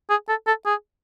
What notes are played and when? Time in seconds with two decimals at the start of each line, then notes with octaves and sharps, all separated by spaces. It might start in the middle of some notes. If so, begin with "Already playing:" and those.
0.10 G#4
0.29 A4
0.47 A4
0.66 G#4